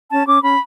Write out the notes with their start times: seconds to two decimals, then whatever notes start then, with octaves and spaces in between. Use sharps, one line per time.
0.10 C#4 A5
0.26 C#4 D6
0.42 C#4 B5